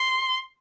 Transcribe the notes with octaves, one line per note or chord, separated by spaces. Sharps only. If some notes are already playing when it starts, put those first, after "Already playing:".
Already playing: C6